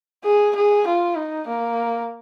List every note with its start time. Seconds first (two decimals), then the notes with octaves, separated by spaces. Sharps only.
0.24 G#4
0.55 G#4
0.87 F4
1.17 D#4
1.47 A#3